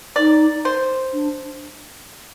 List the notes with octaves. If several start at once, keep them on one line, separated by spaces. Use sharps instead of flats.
D#4 D5
C5
D4